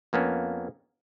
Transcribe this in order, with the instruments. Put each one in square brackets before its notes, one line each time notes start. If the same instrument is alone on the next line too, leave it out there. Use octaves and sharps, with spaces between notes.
[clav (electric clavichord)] F2 A#3 B3 C#4